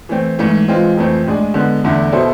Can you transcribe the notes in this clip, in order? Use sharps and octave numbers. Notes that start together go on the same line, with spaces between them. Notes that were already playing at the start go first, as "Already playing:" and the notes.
E3 A3 C4
G#2 E3 A3
E3 G#3 C4 F4
F2 E3 A3 C4
A2 G#3 D4 G#4
D3 G#3 B3
E2 D3 A3 E4
B2 B3 E4 A4 C5